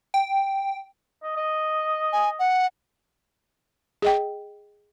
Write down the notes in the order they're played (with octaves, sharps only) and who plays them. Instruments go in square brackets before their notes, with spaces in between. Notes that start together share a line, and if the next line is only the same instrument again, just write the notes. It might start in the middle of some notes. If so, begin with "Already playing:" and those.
[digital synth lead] G5
[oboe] D#5
D#5
[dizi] G#5
F#5
[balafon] G#4 D#5 G5